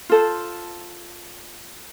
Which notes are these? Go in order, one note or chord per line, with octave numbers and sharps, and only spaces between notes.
F4 A4 C5